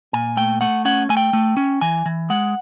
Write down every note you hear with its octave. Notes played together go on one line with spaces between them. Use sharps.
A#2 G#5
A3 G5
A3 F#5
C#4 F#5
A3 G#5
G5
A3
C#4
E3 G#5
E3
G#3 F#5